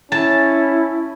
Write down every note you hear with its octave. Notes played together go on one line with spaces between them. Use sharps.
C#4 E4 A5